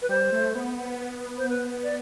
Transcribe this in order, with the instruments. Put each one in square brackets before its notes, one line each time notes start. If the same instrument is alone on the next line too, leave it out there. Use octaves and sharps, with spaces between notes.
[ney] B4
[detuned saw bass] G3 [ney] C5
[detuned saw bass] A3
B3
[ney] C5
B4
D5